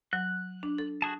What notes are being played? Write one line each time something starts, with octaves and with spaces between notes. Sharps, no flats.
F#3 F#6
D4
A4
F#4 G#4 A5